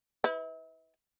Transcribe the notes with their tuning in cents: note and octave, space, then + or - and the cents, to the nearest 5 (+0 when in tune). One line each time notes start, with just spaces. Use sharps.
E4 -40 B4 +15